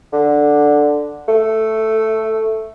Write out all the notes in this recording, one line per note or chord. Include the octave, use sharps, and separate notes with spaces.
D3
A3